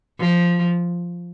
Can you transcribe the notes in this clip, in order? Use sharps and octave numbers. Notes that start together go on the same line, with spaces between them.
F3